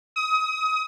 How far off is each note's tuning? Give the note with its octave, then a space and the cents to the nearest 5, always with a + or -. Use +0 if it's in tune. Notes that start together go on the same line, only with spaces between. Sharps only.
D#6 +30